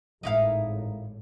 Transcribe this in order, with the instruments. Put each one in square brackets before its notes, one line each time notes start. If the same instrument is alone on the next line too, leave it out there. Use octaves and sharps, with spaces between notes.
[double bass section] G#1 A2 [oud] D#4 E4 F5